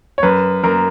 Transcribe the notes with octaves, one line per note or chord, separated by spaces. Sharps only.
C#5
F#2 B4
F#2 A#4